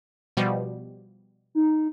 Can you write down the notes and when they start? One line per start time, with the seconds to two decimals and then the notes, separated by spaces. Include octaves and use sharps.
0.37 B2 F3 G3
1.55 D#4